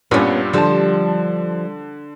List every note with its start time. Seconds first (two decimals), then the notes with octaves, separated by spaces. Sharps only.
0.11 G2 A#2 G3 B3 C#4
0.53 D3 F3 G3 A5